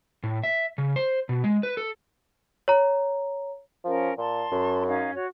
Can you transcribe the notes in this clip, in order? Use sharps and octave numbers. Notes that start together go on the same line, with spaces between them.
A2
E5
C#3
C5
B2
G#3
B4
A4
C#5 A#5
F3 C#4 A#4
A#2 A5 C6
F#2
C#4 D#4 F5
F#4 C#5